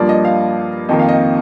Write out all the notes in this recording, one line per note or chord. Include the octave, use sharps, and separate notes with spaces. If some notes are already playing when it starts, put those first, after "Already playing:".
Already playing: G2 F3 A#3 D5
D#5
F5
F2 D#3 A#3 D#5
F5
D#5